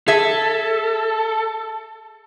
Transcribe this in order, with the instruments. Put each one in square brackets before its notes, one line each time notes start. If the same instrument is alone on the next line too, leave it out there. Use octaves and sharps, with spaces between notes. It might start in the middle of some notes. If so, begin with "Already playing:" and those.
[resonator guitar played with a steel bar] G#4 E5 [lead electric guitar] A4